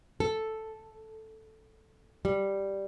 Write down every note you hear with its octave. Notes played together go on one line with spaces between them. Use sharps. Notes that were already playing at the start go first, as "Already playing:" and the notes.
A4
G3